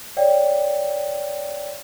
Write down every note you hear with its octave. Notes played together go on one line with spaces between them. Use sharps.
C#5 D5 F5 G5